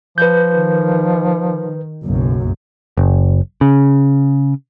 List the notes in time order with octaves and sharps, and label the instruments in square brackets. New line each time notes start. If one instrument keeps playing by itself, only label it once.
[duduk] F3 [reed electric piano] B4 G6
[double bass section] D#3
F#1 B1 F#2
[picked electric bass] F#1
C#3